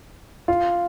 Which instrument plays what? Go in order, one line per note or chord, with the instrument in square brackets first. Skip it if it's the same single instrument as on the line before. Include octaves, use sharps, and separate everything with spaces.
[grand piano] F4